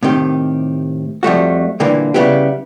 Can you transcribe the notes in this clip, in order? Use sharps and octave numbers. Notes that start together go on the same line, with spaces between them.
A2 C3 D#3 G4
F2 G3 A3 F#4
A#2 D3 E3 G3 A#3
C#3 G3 B3 E4 G4